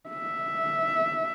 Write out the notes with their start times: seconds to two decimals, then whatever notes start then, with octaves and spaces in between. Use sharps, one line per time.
0.09 E5